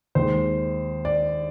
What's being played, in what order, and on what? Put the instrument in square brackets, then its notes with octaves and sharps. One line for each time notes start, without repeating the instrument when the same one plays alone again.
[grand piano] D#2 D#3 G#3 C5
D5